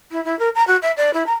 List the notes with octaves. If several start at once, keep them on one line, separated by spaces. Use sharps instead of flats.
E4
E4
A#4
A#5
F#4
E5
D5
E4
A#5